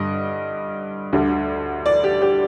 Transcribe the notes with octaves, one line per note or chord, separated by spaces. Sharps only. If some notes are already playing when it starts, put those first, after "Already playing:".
Already playing: G2 D3 G3 D#5
D2 D3 G3 D4
D5
G4
G4